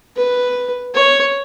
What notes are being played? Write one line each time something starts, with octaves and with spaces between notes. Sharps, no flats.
B4
C#5